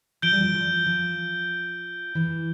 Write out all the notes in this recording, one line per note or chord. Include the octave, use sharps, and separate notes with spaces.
F3 G6 D7 G7
G3
F3
F3
F3
E3